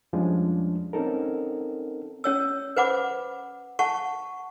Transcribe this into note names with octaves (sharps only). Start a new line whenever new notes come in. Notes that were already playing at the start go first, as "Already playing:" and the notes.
F2 F3 G3 G#3 C#4 D4
C4 C#4 D#4 A4 A#4
C#4 C#5 E6
B4 C5 F#5 B5 D6
F#5 A5 C#6